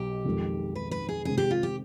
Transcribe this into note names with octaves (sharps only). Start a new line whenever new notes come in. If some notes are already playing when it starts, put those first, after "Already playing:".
Already playing: B1 B2 G4
F2 D#3 G#3
B4
B4
G#4
C3 D#3 G#3 C4 G#4
G4
F4
G4